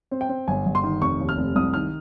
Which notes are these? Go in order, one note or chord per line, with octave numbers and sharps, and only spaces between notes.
C4
G5
C4
G1 G#5
G1
C6
D#3
F1 C#6
D#2
F6
F1
C2 D#6
D#3 F6